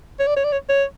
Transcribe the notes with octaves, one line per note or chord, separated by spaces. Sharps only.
C#5
D5
C#5
D5
C#5
C#5